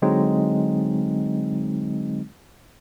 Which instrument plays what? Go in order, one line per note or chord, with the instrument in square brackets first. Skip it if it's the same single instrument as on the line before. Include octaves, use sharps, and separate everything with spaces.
[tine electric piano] D3 F#3 G#3 C4 D#4